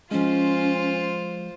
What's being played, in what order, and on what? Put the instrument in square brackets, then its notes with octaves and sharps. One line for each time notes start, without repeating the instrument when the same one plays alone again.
[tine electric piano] F3 G#3 [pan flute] C#4 [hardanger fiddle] F4 C5